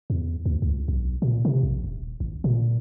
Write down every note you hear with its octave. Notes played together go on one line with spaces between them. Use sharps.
E2
D2
C#2
B1
A#2
C3
A#1
D#1
G#1
A#2